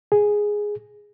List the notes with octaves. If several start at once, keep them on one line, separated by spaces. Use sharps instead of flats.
G#4